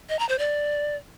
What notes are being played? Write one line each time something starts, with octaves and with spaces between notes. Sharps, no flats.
D#5
A#5
C5
D5